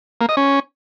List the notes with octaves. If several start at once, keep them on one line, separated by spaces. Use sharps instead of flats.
A#3
D#5
C#4